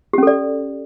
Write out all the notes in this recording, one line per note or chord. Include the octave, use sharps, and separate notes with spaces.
C#4 G4 A4 D5